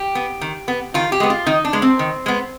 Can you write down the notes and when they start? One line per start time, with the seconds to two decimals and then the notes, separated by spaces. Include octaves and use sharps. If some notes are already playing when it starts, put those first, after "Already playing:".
Already playing: G4
0.15 B3
0.41 D#3
0.68 B3
0.94 D#3 F4
1.12 G4
1.20 G#3 B3
1.30 F4
1.46 D#3 D#4
1.65 D4
1.73 G#3 B3
1.82 C4
1.99 D#3
2.26 G#3 B3